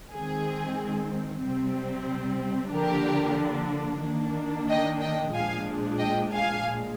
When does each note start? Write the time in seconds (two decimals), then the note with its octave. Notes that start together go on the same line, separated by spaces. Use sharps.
0.12 D#3 G#3 C4 G#4
1.42 C3 G3 C4
2.73 D3 F3 A#3 D4 G4 A#4
4.03 D#3 A#3 D4
4.68 D#5 G5
5.01 D#5 G5
5.34 A#2 F3 G#3 D4 F5 G#5
5.99 D#5 G5
6.32 F5 G#5
6.65 A#2 G#3